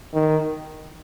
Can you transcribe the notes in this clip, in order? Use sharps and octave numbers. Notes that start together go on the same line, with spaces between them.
D#3